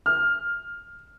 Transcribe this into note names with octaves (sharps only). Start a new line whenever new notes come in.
F6